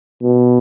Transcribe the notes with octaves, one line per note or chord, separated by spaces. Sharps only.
B2